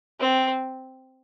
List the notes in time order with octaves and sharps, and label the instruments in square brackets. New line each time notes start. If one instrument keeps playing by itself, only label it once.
[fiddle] C4